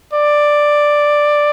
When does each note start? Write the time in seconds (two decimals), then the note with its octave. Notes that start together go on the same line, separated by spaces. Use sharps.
0.13 D5